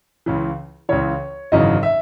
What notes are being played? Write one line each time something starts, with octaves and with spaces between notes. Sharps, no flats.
C#2 C#3 E3
C#2 C#3 E3 C#5
G#1 F#2 C#3 E3 D#5
E5